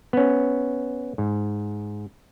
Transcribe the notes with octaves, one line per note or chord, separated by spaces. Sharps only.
B3 C#4
G#2